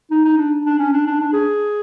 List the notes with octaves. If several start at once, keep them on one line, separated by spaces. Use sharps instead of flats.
D#4
D#4
D4
D4
C#4
D4
D4
D4
G#4